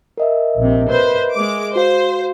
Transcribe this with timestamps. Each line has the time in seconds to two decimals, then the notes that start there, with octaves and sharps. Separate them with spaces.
0.18 A#4 D#5 E5
0.58 A#1 C3
0.89 B4 C5
1.34 G#3 D6
1.76 F#4 C5 F5